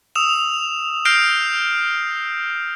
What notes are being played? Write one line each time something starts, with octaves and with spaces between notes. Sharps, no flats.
D#6 E6 E7 F7
F6 G6 A#6 C7 D7 F7